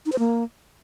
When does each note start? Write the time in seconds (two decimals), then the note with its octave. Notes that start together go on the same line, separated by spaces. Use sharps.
0.06 D#4
0.12 C5
0.19 A#3